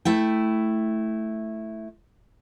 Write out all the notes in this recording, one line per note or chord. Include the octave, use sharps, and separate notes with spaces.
A3 E4 G5